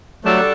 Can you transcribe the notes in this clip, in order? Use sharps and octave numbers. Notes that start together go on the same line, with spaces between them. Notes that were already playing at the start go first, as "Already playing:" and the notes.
F#3 G3 A3 D4 F#4 A4